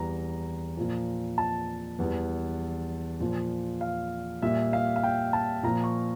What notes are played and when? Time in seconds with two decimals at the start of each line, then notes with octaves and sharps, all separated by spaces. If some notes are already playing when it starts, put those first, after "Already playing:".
Already playing: E2 E3 G3 A#5
0.77 A#2 F3
1.38 A5
1.99 E2 E3 G3
3.20 A#2 F3
3.81 F5
4.42 A#2 G3 E5
4.73 F5
4.96 F5
5.03 G5
5.33 A5
5.63 A#2 F3 A#5
5.84 C#6